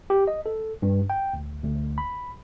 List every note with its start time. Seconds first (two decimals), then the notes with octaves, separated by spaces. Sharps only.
0.10 G4
0.28 D#5
0.46 A4
0.82 G2
1.10 G5
1.33 D2
1.64 D2
1.98 B5